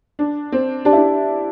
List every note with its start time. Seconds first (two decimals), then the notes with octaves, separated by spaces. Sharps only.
0.19 D4
0.52 C4
0.85 D4 G4 D5 A5
0.93 E4
0.96 D4